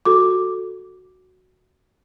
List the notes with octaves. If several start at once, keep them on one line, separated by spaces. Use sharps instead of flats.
F#4 A4 D6